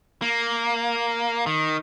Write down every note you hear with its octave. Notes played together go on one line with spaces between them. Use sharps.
A#3
D#3